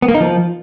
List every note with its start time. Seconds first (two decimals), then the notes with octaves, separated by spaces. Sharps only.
0.02 B3
0.08 A#3
0.14 D#4
0.20 F3